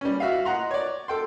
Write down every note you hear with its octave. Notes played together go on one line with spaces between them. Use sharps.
G3 C#4
F#4 E5 F5
D#5 F#5 A#5 C6
C#5 D5
A4 G5 C6